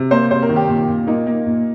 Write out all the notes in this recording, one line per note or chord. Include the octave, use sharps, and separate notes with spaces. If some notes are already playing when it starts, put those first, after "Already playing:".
Already playing: C3
A#3 C5
C3 C5
A#4
D#3
G4
A#2
A#2
A#3 D#4
A#3
A#2